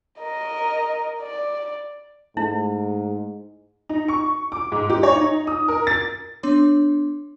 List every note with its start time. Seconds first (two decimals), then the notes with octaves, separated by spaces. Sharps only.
0.21 A#4 D#5
1.22 D5
2.37 G#2 A3 E4
3.89 D#4
4.08 C#6
4.52 D6
4.72 G#2
4.90 G4
5.03 C#5
5.16 D#4
5.47 D#6
5.68 A#4
5.87 A6
6.43 B3 D4 C#5 C6 D6